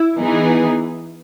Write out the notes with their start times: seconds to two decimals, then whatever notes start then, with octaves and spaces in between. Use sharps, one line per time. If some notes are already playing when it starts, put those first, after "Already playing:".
Already playing: E4
0.17 E3 B3 D#4 G#4